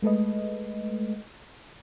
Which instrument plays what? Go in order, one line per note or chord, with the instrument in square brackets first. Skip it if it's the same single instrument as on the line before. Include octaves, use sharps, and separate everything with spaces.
[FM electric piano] G#3 A3 A4 B4 D#5